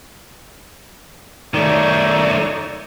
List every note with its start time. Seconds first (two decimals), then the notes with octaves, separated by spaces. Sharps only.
1.54 D#3 A3 D#4 C#5 D5